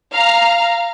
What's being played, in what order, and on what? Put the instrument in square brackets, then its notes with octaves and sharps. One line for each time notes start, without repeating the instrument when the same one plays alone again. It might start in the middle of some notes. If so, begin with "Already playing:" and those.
[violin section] F5 A#5 F6